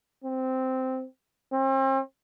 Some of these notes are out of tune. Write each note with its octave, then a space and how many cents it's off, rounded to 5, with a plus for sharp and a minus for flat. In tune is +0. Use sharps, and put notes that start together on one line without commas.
C4 -10
C4 +40